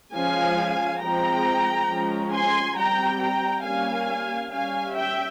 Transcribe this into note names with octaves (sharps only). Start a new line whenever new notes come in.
F3 G#3 C#4 F5 G#5
F3 G#3 C4 G5 A#5
F3 G#3 C#4
G#5 C6
G3 C4 G5 A#5
G5 A#5
G3 A#3 C#4 F5 G#5
G3 C#4 F5 G#5
E5 G5